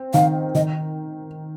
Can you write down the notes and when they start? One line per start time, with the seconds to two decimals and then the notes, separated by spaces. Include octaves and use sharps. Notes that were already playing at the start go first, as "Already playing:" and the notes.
Already playing: C4
0.14 D#3 F5
0.55 D#3 D#5